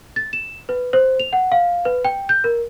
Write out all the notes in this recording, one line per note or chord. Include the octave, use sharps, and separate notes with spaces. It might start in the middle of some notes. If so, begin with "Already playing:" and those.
A6
E7
B4
C5
F7
F#5
F5
B4
G5
G6
A#4